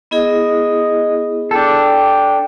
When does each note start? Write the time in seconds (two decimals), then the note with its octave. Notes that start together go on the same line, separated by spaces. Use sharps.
0.11 B3 E4 G#4 D#5
1.51 D4 A4 G5